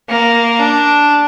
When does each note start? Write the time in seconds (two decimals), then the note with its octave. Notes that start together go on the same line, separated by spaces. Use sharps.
0.09 A#3
0.60 D4